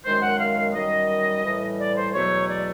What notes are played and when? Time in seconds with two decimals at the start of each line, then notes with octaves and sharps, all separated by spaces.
0.04 F#2 D#3 G#3 C5
0.22 F#5
0.40 F5
0.74 F#2 D#3 G3 D#5
1.44 A2 E3 G3
1.79 D5
1.96 C5
2.13 E2 B2 F#3 A3 C#5
2.49 D5